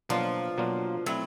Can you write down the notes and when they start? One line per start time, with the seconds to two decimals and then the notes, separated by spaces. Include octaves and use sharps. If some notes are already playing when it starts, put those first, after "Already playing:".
0.09 B2 F3 F#3 A#3 D4 F4
0.58 B2 F#3 A#3 D4 F4
1.06 F#3 A3 C4 E4